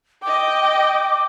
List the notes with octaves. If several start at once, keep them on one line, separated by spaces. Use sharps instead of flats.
D#5 G5 D6